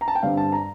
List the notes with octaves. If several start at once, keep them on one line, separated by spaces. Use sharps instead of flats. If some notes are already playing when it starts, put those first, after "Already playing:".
A#5
A5
G5
G2 D3 G3 C4 F5
A5
A#5